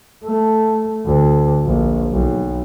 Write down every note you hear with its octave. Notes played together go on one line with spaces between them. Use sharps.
A3
D2
A#1
B1